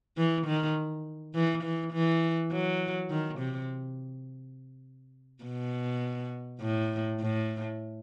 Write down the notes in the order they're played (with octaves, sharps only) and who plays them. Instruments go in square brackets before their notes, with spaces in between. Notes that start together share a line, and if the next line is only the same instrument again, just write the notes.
[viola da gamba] E3
D#3
E3
E3
E3
F#3
D#3
C3
B2
A2
A2